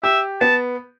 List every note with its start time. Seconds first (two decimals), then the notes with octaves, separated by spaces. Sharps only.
0.03 G4 E5
0.41 B3 A5